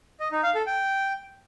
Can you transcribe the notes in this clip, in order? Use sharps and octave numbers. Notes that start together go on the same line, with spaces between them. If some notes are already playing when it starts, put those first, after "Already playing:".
D#5
D#4
F5
A4
G5